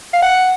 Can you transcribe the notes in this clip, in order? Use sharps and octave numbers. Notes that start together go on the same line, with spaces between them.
F5
F#5